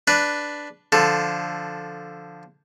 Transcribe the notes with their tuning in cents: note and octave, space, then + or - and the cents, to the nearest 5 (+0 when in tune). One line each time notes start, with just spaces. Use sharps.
D4 +0 B4 +0 D5 +0
D3 +0 F3 +0 A4 +5